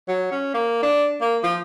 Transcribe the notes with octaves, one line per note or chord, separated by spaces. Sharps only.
F#3
C#4
A#3
D4
A#3
F3